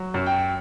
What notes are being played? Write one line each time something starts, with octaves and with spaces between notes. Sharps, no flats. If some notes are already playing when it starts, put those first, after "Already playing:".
Already playing: F#3
F#2
G5